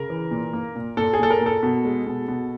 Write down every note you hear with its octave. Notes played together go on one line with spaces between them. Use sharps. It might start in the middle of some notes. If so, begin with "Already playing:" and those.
Already playing: C#3 A#4
E3
A#2
A#3
A#2
A#2 A4
G#4
A#2 A4
A#4
A#2
A4
B2
G#3
B2
B2